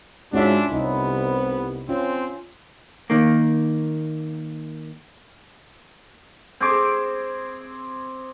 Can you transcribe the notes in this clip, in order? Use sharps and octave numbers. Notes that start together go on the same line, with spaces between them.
G#2 C#4 D4 F4 F#4 E5
C2 B3 D#4 E4
C4 C#4 F4
D#3 A#3
C4 G#4 D6